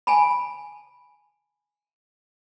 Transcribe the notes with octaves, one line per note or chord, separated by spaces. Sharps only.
G#5 A5 B5